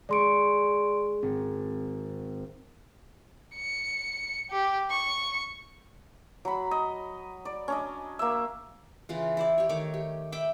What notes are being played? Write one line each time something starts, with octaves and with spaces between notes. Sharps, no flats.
G#3 D5 C6 C#6 D7
G#1 C4
C#7
G4
C#6
F#3 B5
D#5
D5
C#4 D4 D#5
A#3 E5
C#3 E3 F4
E4 C5 D5
G4 C#5
D#3 A3 C#5 D6
G4
E5 G5 B5 D6